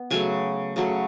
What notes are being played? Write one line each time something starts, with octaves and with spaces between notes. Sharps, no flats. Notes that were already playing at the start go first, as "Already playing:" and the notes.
Already playing: B3
C#3 F#3 A3 G#5
C#3 F#3 A3